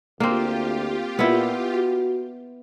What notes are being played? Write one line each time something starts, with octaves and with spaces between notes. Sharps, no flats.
D2 A#3 C4 F4 G4
A#2 B3 E4
F#4